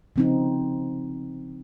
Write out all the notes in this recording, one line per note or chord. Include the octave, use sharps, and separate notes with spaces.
C#3 F3 C4 D#4